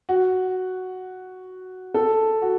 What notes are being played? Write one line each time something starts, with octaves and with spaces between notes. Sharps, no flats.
F#4
A4
F#4